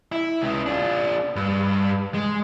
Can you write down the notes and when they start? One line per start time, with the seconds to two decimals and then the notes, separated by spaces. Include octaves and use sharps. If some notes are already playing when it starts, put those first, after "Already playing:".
0.12 E4
0.42 C#2 C#3
0.66 D4 F4
1.36 G2
2.14 G#3